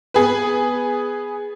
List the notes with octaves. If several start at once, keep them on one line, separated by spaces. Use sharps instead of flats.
B3 G#4 B4